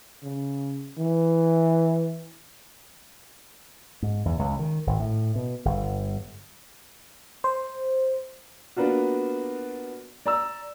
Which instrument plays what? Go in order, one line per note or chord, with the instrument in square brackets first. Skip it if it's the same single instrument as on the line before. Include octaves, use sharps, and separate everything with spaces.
[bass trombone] C#3
E3
[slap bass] G#2
E2
C#2
D#3
G#1
A2
B2
G1
[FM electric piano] C5
[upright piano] A#3 B3 D4 F4 F#4
D5 A#5 E6